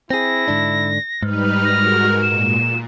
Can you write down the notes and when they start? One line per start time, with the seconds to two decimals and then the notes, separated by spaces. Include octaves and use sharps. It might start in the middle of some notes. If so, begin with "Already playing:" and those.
0.11 C4 E4 G#4 A#6
0.48 G#2 D3 D4
1.23 G#2 G3 D#4 B4 F6
1.65 G#3 F#4 A#4 A#6
2.22 A#2 E7